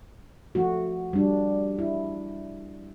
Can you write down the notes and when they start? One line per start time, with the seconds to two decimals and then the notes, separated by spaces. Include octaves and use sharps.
0.55 F3 A3 F#4
1.13 G3 D4
1.79 E4